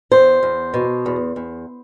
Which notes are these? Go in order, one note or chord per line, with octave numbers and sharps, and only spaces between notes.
E2 C5
E2
B2
E2
E2